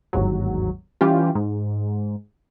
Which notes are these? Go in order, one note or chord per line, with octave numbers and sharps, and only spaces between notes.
G1 D#2 G#2 F#3
E3 G3 C#4 F4 G4
G#2